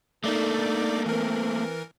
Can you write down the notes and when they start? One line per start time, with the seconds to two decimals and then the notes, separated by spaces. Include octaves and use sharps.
0.24 A3 A#3 D4 D#4 A4 D5 D6
1.06 E3 C4 A#4